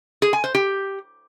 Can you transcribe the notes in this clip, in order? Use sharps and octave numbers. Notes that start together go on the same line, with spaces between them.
G#4
G#5
C5
G4